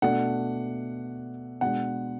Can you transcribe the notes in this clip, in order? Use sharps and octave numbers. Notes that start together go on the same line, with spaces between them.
B2 A3 D4 F#5
B2 G#3 D4 F#5